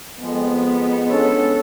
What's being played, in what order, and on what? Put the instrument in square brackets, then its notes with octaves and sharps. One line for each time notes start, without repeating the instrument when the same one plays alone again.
[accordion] F2 F3 G#3 [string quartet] B3
[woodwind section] C#4 D4 A4